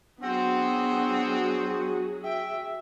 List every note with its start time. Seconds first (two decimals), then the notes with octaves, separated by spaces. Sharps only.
0.22 F#3 B3 C4 D4 F#4 G#4 F#5
2.23 E5 G5